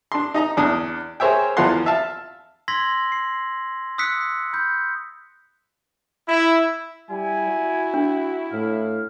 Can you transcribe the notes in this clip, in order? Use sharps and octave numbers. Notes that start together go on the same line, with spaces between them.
D4 C6
D#4 D#5 A#5
E2 D4 D#6
G#4 A#4 C5 C#5 E5 G5
E2 E3 F3 F4 F#5 C6
E5 F5 A5
C6 E6 G#6 A#6 B6 F#7
C7
D#6 E6 F#6 B6 C#7
B5 G6
E4
G3 E4 G#5
F#4
D4
A2 F5